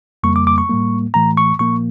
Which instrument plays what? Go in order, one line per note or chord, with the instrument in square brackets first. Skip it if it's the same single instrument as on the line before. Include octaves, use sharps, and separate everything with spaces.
[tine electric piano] F2 C#3 G3 A#3 C#6
D6
D6
C#6
A2 G3 A#3
A2 E3 A3 A#5
C#6
A#2 F3 A#3 C#6